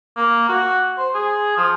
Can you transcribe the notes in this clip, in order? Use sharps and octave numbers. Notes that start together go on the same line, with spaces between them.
A#3
F#4
C5
G#4
F3